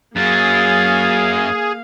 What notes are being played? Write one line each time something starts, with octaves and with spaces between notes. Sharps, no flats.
F#2 F#3 A#3 G#4 F5 A6